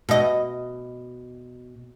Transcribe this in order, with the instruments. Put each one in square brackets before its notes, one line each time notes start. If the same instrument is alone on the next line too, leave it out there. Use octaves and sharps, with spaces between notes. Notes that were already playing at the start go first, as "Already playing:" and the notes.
[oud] B2 D#5